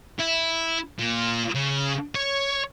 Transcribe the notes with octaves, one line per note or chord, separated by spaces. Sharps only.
E4
A#2
C#3
C#5